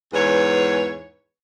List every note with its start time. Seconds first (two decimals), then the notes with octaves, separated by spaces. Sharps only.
0.13 E2 G#2 B4 C#5